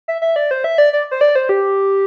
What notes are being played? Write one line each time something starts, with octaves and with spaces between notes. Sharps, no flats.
E5
E5
D5
C5
E5
D5
D5
C5
D5
C5
G4